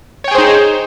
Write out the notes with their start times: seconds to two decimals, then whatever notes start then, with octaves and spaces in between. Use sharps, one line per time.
0.24 C#5
0.28 G5
0.31 G#4
0.35 C5
0.38 D#4